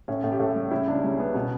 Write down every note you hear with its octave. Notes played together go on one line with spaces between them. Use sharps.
A2 C#4
A2
G4
A2 A4
G3
C#3 E4
C#2 D4
G3 C#4
C#3 B3
B2 B3